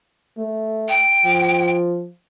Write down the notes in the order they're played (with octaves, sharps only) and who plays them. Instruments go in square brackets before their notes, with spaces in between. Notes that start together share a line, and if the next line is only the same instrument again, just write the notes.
[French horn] A3
[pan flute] G5
[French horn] F3